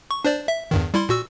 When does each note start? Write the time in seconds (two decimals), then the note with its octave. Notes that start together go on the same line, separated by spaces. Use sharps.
0.11 C#6
0.25 D4 C5 D5
0.48 E5
0.71 E2 G2 D#3
0.94 G3 E4 C6
1.09 A#2 F#4 E6